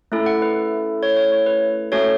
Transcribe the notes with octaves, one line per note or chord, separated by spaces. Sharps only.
A3 C#4 E4 A4
F#5
B4
C#5
C#5
C#5
B4
A3 C#4 F#4 A4 C#5